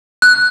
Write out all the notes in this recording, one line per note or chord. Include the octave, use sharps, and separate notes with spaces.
F#6